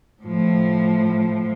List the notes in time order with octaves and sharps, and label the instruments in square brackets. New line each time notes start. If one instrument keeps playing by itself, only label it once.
[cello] A2 F3